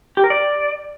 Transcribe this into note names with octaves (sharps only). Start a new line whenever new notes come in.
G4
A#4
D5